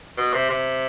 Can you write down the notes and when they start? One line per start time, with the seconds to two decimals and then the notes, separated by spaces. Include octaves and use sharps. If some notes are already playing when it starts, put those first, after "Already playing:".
0.18 B2
0.34 C3
0.50 C3